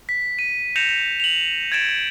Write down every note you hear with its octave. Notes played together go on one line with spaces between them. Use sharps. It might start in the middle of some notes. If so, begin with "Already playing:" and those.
B6
D#7
G6 A#6 C#7 E7 F7
F7 F#7
G#6 A6 D7 E7